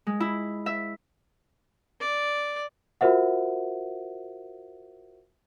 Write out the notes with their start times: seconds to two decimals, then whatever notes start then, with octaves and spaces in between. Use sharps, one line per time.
0.07 G#3
0.20 E4
0.66 E5
2.00 D5
3.01 F4 F#4 A#4 C5 E5 F#5